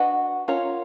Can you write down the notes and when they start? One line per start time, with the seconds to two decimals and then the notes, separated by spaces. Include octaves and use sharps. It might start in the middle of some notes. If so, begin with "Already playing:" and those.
Already playing: D4 F#4 B4 D#5
0.48 C#4 F4 A#4 C#5